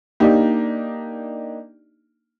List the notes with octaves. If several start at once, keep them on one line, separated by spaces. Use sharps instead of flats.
A#3 D4 D#4 G4